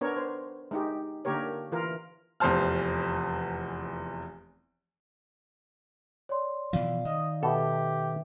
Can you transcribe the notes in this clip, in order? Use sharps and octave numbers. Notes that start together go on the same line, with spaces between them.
B3 D4 A#4 C#5
C5
G#3 D#4 G4
D3 A#3 G4 A#4 C#5
E3 F4 A#4
F1 E2 E3 C5 A5 F6
C#5 D5 C6
B2 E3 F3 D5 F5
D#3 D#5
B2 G4 A4 B4 E5